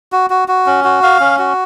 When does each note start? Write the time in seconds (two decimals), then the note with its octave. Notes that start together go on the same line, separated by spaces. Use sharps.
0.12 F#4
0.30 F#4
0.48 F#4
0.66 C#4
0.84 F#4
1.03 F5
1.20 C#4
1.39 F#4